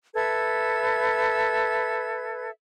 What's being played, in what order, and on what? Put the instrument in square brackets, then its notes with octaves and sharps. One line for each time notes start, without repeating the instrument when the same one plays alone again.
[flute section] A4 B4 E5 G#6